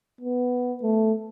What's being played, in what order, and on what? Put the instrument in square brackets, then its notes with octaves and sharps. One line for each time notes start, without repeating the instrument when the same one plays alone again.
[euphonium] B3
A3